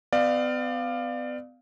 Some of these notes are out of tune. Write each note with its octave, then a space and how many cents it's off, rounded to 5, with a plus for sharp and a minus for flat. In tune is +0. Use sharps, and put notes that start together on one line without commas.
B3 +40 D5 +25 F5 +0